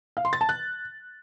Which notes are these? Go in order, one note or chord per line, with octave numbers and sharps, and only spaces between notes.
F5
C6
A6
A5
F#6